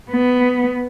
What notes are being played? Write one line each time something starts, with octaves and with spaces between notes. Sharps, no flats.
B3